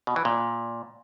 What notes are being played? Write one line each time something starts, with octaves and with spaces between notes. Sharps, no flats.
B2
E3
A#2